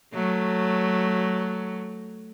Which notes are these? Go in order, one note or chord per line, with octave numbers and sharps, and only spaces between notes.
F#3 A3